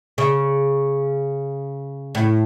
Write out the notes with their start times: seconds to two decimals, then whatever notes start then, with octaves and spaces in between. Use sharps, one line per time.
0.18 C#3
2.15 A2